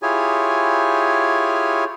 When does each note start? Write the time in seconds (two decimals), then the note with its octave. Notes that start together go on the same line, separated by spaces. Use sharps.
0.02 E4 F4 G4 G#4 C#5 G#5